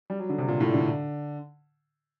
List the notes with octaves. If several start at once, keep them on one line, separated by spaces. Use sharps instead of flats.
G3
F#3
D3
C3
A#2
A2
D3